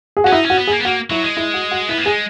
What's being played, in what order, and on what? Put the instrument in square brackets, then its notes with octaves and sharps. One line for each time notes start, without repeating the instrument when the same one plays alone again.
[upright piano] G#4
[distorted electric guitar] C#4 [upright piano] F#4
[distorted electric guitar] D#4 [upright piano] E4
[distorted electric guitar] C#4 [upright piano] F#4
[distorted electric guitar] B3
[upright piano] G#4
[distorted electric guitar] A#3
B3
[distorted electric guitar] A#3 [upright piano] F#4
[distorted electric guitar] F#3 [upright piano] E4
[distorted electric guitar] G#3
[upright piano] E4
F#4
F#4
[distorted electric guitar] B3 [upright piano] E4
[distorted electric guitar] A#3
[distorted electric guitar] G#3 [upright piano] G#4